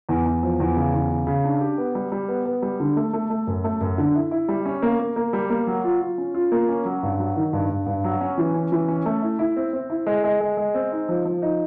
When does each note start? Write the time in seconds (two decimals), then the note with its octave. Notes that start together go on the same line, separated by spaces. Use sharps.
0.09 E2
0.26 E2
0.43 F3
0.60 E2
0.76 C#3
0.93 E2
1.10 C#3
1.27 C#3
1.44 D4
1.61 G4
1.78 B3
1.95 G3
2.12 G3
2.28 B3
2.46 B3
2.62 G3
2.80 D3
2.97 A3
3.13 A3
3.30 A3
3.47 F#2
3.64 A3
3.81 F#2
3.98 D3
4.15 E4
4.31 E4
4.48 G3
4.65 C#4
4.82 A#3
4.99 A#3
5.16 A#3
5.33 G3
5.50 A#3
5.67 F#3
5.84 F4
6.01 F4
6.18 C#4
6.35 F4
6.52 A#3
6.69 C#4
6.85 F#3
7.03 G2
7.19 F#3
7.36 D#3
7.53 G2
7.69 G2
7.86 G2
8.04 F#3
8.21 C#4
8.38 E3
8.54 C#4
8.72 E3
8.88 C#4
9.06 A3
9.22 E4
9.39 E4
9.56 C4
9.73 C4
9.90 E4
10.06 G#3
10.24 G#3
10.40 G#3
10.57 G#3
10.74 C4
10.91 D#4
11.09 F3
11.25 F3
11.42 D#4